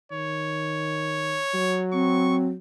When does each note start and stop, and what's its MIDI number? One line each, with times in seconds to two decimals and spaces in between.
0.12 1.38 51
0.12 1.86 73
1.54 2.56 54
1.93 2.47 60
1.93 2.36 85